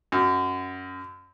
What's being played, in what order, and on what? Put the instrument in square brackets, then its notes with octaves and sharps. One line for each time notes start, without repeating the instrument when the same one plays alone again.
[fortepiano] F#2